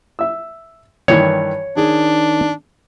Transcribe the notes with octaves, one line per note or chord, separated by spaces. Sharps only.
E5 E6
G2 D#3 E3 C#5
D#3 D4 G#4